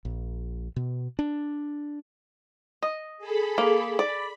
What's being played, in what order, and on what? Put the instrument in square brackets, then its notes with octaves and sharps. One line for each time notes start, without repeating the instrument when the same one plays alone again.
[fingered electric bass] A#1
B2
D4
[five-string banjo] D#5
[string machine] G#4 A4 B5
[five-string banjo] A#3
[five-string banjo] D5 [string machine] B5